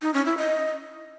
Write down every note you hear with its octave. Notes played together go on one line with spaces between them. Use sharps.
D#4
C#4
E4
D#5